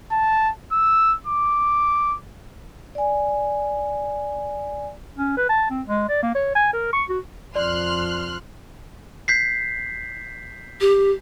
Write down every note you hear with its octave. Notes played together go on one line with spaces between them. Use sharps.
A5
E6
D6
D5 G#5
C#4
B4
A5
C4
G#3
D5
A#3
C#5
G#5
A#4
C#6
F#4
F2 F3 D5 C6 F6 F#6
G6 B6 C7
G4